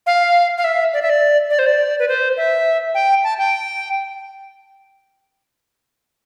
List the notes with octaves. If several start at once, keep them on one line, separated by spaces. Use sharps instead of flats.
F5
F5
E5
D5
E5
D5
D5
C5
D5
B4
C5
E5
G5
A5
G5